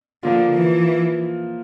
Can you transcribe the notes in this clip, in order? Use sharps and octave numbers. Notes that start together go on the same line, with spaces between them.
D3 F3 A#3 F4
E3